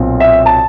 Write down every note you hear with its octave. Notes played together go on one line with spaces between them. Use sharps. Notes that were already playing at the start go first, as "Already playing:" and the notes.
Already playing: B1 A#2 C4
E5
A5